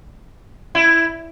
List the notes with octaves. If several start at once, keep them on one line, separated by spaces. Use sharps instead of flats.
E4